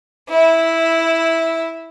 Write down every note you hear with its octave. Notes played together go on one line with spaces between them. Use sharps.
E4